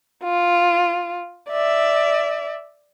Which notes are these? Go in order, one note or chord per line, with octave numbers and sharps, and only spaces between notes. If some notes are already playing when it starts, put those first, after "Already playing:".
F4
D5 E5